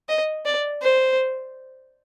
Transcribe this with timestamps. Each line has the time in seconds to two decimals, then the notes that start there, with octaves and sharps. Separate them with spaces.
0.09 D#5
0.46 D5
0.82 C5